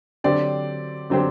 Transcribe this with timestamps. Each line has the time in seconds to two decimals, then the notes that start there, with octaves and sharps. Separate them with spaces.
0.24 D3 F#3 C4 G4 C5 D5
1.10 D3 F#3 C4 G4 C5